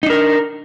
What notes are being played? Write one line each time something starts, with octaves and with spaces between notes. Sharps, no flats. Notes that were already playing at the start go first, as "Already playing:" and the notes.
D4 D#4 A#4